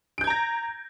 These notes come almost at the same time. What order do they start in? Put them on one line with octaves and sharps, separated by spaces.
D7 G6 G#6 A#5 A#6